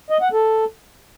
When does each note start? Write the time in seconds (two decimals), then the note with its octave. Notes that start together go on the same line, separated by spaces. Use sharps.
0.10 D#5
0.22 F#5
0.33 A4